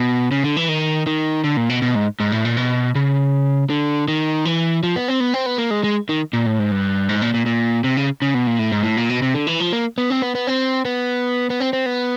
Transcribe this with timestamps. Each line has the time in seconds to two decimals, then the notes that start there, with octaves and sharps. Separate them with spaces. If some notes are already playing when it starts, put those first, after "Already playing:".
Already playing: B2
0.31 C#3
0.44 D3
0.57 E3
0.69 D#3
1.07 D#3
1.44 D3
1.57 A#2
1.69 B2
1.82 B2
1.95 G#2
2.20 G#2
2.32 A2
2.45 A#2
2.57 B2
2.95 C#3
3.70 D3
4.08 D#3
4.45 E3
4.83 F3
4.96 B3
5.08 C4
5.20 B3
5.34 C4
5.46 B3
5.58 A#3
5.71 G#3
5.84 G#3
6.09 D#3
6.33 A#2
6.46 A2
6.59 G#2
6.72 G2
7.09 G#2
7.22 A#2
7.34 A#2
7.46 A#2
7.84 C3
7.97 C#3
8.22 C#3
8.34 B2
8.47 A#2
8.59 A2
8.72 G#2
8.83 A2
8.97 A#2
9.10 B2
9.22 C3
9.35 D3
9.47 E3
9.60 F3
9.73 A#3
9.98 B3
10.10 C4
10.22 B3
10.35 B3
10.47 C4
10.85 B3
11.50 B3
11.60 C4
11.73 C4
11.86 B3